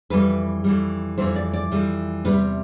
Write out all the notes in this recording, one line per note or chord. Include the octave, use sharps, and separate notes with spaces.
F2 E3 G3 B4
F2 E3 G3
F2 E3 G3 C5
D5
D5
F2 E3 G3
E2 C3 G3 B4